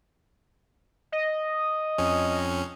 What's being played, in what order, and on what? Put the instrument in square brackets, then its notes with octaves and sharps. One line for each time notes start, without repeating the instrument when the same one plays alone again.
[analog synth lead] D#5
[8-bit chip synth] F2 C#4